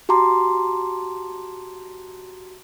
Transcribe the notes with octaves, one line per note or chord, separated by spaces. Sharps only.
F#4 G4 A5 A#5 C6 D6